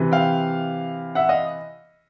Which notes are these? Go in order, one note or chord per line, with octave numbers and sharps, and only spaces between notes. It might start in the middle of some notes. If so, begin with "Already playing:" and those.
Already playing: C3 E3
F5 G5
E5 F#5
D#5 F5